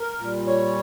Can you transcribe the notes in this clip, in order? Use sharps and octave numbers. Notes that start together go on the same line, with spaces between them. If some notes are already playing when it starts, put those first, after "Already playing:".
Already playing: A#4
A#2 G3
C#5